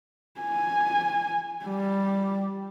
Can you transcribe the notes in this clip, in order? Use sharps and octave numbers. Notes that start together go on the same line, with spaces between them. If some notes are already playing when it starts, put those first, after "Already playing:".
G#5
G3